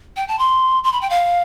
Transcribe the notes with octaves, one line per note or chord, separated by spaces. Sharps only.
G5
A5
C6
C6
B5
G5
F5